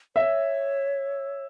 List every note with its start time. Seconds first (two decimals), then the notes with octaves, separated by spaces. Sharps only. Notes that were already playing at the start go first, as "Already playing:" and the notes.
0.16 C#5 E5